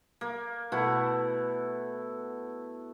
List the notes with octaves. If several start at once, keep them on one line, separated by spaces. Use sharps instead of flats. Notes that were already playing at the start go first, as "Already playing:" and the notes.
A#3
B2 A3 E4 F#5